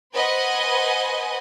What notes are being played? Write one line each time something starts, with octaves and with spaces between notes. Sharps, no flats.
B4 C5 D#5 F#5 G#5